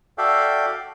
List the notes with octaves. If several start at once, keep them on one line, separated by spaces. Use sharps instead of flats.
F#4 A4 D5 E5 F5 G5